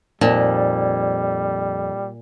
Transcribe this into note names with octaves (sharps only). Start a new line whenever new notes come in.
F2 A#2 G3 D#4 A5